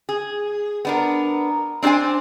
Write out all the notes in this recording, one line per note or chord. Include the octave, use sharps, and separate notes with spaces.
G#4
B3 D4 A#4
C4 D4 G4 C5 G#5